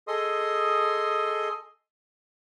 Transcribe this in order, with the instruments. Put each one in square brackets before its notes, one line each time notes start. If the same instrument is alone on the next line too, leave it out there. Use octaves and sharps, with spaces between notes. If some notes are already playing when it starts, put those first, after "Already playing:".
[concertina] G#4 A4 D#5 C6 D#6